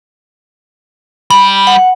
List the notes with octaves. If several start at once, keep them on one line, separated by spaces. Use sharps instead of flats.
G3 B5
F#5